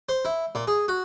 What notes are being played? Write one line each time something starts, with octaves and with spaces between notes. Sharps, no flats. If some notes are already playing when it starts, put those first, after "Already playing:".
C5
E4
A#2
G#4
F#4